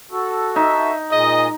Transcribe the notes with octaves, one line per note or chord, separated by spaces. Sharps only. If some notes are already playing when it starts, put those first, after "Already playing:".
F#4 A4
D#4 E5
A#2 G#3 G#4 D#5